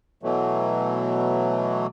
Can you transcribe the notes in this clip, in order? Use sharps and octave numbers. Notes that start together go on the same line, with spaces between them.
B2 E3 F#3 A3